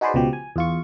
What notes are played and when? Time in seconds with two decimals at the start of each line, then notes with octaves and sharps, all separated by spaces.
0.01 D#4 F#4 G#4 B4 C5 D5
0.14 C#2 B2 F3 G4
0.33 G#5
0.56 E2 F4 C#6